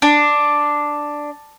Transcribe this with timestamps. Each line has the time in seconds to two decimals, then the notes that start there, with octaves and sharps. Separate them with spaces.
0.02 D4